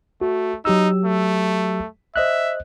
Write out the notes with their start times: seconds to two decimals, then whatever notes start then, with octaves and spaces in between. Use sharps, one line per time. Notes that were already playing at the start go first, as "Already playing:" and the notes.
0.21 A3 F#4
0.65 F#3 D#4 G4 E6
1.05 A3
2.16 C5 D#5 E5 F#6